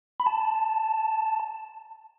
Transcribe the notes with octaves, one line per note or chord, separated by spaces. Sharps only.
B5
A5